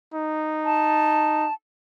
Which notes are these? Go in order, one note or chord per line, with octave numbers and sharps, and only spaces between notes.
D#4
A5